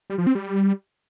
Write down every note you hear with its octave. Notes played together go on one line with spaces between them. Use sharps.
G3
F3
C4
G3